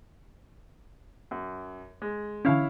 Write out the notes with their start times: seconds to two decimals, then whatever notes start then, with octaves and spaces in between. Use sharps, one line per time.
1.31 F#2
2.02 G#3
2.45 D3 E3 C#4 E4 C#5 F5